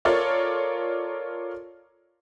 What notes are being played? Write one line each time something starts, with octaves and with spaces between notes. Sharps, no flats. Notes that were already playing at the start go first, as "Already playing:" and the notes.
F4 A4 A#4 C#5 D5